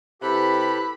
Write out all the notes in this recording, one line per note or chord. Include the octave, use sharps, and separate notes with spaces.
C3 E4 G4 A4 B4 B5 F#6